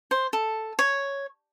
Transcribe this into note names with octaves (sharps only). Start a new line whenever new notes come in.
C5
A4
C#5